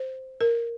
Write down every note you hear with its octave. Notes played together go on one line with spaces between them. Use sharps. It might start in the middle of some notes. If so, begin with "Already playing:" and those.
Already playing: C5
A#4